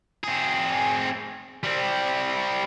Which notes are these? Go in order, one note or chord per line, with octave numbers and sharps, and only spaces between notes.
C4 G#4
G3 C4